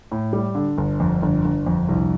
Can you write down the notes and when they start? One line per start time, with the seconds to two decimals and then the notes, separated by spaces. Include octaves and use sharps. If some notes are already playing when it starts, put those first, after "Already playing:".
0.12 A2
0.33 G3
0.55 D3
0.78 G1
1.00 F2
1.22 G1
1.44 G1
1.67 F2
1.89 C2